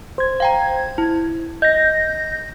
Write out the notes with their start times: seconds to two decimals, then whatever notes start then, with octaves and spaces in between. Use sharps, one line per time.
0.18 C5 G#6
0.40 F5 G5 A#5
0.98 E4
1.62 D#5 G6 A#6